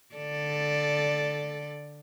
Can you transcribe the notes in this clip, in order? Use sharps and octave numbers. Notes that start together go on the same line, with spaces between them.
D3 A4 D5